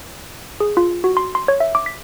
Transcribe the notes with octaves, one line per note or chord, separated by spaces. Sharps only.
G#4
F4
F#4
C6
C6
C#5
E5
D6
B6